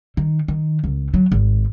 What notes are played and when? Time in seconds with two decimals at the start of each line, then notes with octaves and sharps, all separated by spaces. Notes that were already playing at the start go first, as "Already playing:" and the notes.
0.17 D#3
0.48 D#3
0.84 C#2
1.14 F#3
1.32 G#1